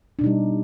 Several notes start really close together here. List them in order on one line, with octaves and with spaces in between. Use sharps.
D4 B2 D#4 G3